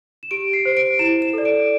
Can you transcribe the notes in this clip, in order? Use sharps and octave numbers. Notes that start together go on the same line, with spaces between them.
E7
G4 D7
C7
C5
D7
E4 E7
E7
A4 D5
D7